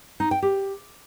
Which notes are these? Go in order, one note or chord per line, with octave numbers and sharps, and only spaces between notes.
D#4
G5
G4